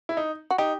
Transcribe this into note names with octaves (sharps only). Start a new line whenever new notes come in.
E4
D#4
F#4
D#4 G4